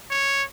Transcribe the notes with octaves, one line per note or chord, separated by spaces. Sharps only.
C#5